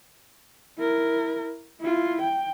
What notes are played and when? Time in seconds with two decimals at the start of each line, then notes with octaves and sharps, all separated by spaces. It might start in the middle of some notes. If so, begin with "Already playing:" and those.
0.78 E4 A#4
1.81 E4 F4
2.22 G5